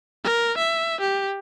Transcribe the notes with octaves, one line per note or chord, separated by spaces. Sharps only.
A#4
E5
G4